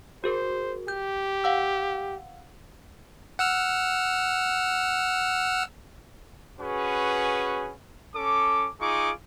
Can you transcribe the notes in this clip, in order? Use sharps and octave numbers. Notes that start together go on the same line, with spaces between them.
F#4 G#4 A#4 C5
G4 G6
F5 F#5 E6
F#5 E6 F6
C#4 F#4 G#4 B4
C#4 A4 D6
D#4 F4 G#4 C#6 D6